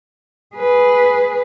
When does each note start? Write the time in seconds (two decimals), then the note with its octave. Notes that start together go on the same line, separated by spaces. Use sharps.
0.56 G#4 B4